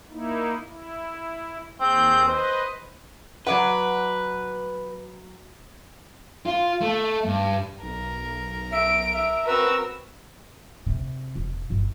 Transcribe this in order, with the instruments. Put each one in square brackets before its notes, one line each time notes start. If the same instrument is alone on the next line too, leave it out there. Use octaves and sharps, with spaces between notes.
[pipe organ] A#3 D#4 E4
E4
[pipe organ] D#2 G#4 G6 [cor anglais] C4
[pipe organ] B4 D#5 [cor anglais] C5
[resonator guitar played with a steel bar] F#3 D5 F#5 [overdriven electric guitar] B4
[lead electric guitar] F4
A3
G2
[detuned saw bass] B1 [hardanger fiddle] A#4
[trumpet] E5 [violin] D7
[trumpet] E5
[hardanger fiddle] C4 F#4 [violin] A#4 E6 [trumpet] B4
[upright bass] C3
E1
G1